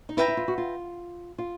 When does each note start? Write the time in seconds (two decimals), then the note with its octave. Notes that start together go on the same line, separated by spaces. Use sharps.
0.09 D#4
0.17 E4 B4 E5 G5 A#5
0.28 E4
0.37 F4
0.48 F#4
0.58 F4
1.38 F4